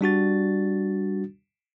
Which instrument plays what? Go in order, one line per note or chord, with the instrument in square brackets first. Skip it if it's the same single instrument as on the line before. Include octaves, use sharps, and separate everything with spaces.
[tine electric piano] G3 D4 F#4 A6